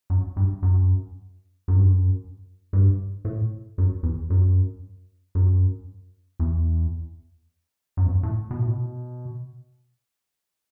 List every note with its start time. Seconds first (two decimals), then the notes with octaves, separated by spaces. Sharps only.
0.10 F#2
0.37 G2
0.63 F#2
1.68 F#2
1.75 G2
1.84 F#2
2.73 G2
3.25 A2
3.78 F#2
4.03 E2
4.30 F#2
5.35 F#2
6.40 E2
7.97 F#2
8.05 E2
8.12 F#2
8.23 A2
8.51 B2
8.59 A2
8.68 B2